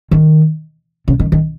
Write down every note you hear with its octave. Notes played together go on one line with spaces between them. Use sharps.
D#3
C#3
D#3
D#3